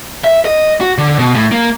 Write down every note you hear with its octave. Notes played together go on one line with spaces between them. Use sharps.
E5
D#5
F#4
D3
B2
A2
A#3